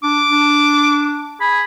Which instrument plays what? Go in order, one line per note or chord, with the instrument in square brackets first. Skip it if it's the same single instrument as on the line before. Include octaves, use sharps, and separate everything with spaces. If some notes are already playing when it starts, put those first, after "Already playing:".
[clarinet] D4 [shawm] D6
[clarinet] D4
[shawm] G#4 [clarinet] B5